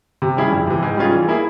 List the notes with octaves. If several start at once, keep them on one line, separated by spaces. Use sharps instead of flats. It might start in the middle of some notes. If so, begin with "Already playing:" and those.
C3
G3 C#4 E4 G#4
F2
C3 E3
G#2
G3 C#4 F4 G#4
E3
A#3 E4 G#4